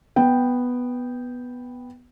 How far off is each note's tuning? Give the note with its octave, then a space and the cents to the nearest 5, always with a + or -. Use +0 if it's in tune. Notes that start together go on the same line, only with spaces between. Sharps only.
B3 +0 G5 +0